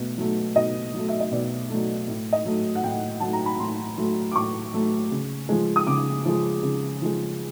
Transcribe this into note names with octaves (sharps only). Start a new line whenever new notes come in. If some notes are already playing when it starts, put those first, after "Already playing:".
Already playing: B2 A3
F#3 A3
B2 D#5
F#3 A3
E5
D#5
B2 D5
F#3 A3
A2
D#5
F#3 A3
F#5
A2 G5
F#3 A3 A5
A#5
B5
A2 C6
F#3 A3
D6
A2 C#6
F#3 A3
C#3
F3 G#3
D#6
C#3 D6
F3 G#3
C#3
F3 G#3